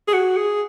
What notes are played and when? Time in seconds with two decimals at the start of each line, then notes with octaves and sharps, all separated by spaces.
0.08 G#4
0.13 F#4
0.37 G#4